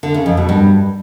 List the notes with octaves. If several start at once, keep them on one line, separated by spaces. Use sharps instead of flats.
D3
C#3
F2
B2
G2